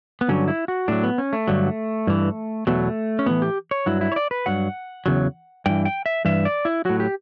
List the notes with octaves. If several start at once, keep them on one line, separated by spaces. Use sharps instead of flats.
B3
G2 D3 F#3 C#4
E4
F#4
A2 F#3 D4
B3
C#4
A3
G2 D3 F#3
G2 E3
E2 B2 F#3 A3
C#4
A2 E3 B3
G4
C#5
G2 F#3 E4
E4
C#5
D5
B4
G2 F#3 F#5
E2 C#3 F#3
G2 E3 G5
G5
E5
G2 E3 E5
D5
E4
A2 F#3 F#4
G4